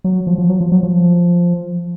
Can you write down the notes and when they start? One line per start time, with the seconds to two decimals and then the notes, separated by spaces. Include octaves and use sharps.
0.04 F#3
0.27 F3
0.38 F3
0.49 F#3
0.61 F3
0.72 F#3
0.83 F3